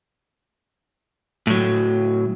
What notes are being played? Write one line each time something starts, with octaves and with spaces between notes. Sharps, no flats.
A2 F#3